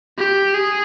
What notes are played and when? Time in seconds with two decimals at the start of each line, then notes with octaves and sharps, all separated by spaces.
0.18 G4
0.54 G#4